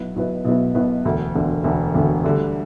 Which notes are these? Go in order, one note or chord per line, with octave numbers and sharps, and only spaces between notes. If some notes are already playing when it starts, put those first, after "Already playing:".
Already playing: B1 B2 B3 E4 B4
B1 B2 B3 E4 B4
B1 B2 B3 E4 B4
B1 B2 B3 E4 B4
E1 D2 D3
E1 D2 D3
E1 D2 D3
E1 D2 D3
D2 D3 G3